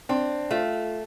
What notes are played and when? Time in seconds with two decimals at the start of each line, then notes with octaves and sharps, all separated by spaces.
0.09 C4 D4
0.51 A3 F4